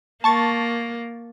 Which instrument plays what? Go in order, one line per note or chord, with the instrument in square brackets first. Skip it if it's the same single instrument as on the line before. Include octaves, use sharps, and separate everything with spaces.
[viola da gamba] A#3 [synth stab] A5 C#6 A6